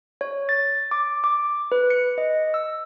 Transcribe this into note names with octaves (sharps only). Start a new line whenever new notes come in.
C#5
A6
D6
D6
B4
C#7
D#5
E6